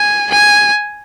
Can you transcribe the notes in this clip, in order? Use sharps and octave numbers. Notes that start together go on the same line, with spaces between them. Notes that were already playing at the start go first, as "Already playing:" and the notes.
Already playing: G#5
G#5